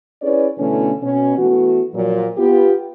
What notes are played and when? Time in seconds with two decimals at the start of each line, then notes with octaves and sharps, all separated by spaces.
0.22 C#4 E4 G#4 B4 C#5 D5
0.58 B2 D3 E3 A3 C#4
1.02 B2 C#4
1.37 E3 A3 B3 F#4
1.94 A#2 F3 F#3
2.38 B3 F4 G4